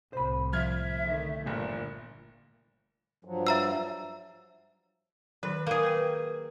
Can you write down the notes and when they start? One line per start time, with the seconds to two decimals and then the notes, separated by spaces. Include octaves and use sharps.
0.13 C2 A2 C5 B5
0.53 F3 E5 F6 G#6
1.00 D3 D#3 A3
1.46 G1 A#2 E3 A3 A#3
3.25 G2 F3 F#3
3.47 E5 A#5 E6
5.43 D#3 F#3 B4
5.67 A#3 G#4
5.83 B4 G5